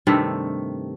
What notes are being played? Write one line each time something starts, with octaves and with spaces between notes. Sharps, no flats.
G2 C3 D#3 A3